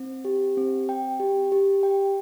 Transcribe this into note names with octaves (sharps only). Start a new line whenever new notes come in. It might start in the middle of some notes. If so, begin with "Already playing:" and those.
Already playing: C4
G4
C4
G5
G4
G4
G5